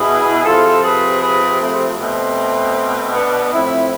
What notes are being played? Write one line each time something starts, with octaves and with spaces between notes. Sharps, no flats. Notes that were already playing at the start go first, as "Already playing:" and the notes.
Already playing: B2 E4 G#4
C3 F3 F4 A4
G#4 B4
G#4 B4
A3 C4
B2 A3 C4
B3 D4
A2 F3 C4 E4